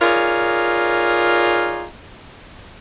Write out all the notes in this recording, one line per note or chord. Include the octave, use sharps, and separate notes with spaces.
D#4 F4 G#4 A#4 C#5 D5